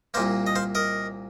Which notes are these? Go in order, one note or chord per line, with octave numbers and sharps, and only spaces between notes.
C2 A#2 A#3 C5 F5
D#5
C5 F5
A#4 D#5